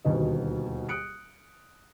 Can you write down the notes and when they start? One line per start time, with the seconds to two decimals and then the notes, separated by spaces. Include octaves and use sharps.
0.05 D#1 D2 B2 D#3 D#5
0.89 D#6 F#6 C#7 D7